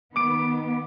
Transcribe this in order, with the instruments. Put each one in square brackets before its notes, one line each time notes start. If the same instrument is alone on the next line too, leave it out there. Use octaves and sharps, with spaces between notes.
[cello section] D#3 B3 [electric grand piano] D6 D7